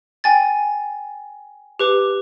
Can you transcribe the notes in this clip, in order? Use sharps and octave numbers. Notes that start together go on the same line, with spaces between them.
G5 G#5 A6
G4 B4 D6